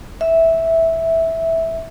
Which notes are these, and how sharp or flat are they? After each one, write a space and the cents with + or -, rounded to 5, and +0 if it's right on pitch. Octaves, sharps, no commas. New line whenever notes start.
E5 -10